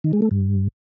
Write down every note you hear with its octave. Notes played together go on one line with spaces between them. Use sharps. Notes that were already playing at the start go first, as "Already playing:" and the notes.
D#3
G#3
A3
G2